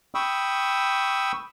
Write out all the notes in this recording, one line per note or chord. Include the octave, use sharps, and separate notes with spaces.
G5 B5 C#6 D#6 E6